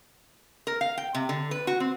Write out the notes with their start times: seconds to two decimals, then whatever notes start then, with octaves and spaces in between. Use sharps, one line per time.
0.67 A#4
0.81 F5
0.98 G5
1.15 C3
1.29 D3
1.51 B4
1.67 F#4
1.80 C4